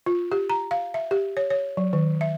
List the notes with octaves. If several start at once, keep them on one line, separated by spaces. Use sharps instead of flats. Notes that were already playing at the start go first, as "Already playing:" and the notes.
F4
G4
A#5
F5
E5
G4
C#5
C#5
F#3
D#3
E5